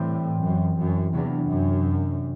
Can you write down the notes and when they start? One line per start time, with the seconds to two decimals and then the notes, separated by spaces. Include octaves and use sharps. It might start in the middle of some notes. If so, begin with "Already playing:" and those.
Already playing: A2 E3 G3 C4 G4 C5
0.42 F#2
0.77 F#2
1.13 E2 C3 F#3 B3 D4
1.49 F#2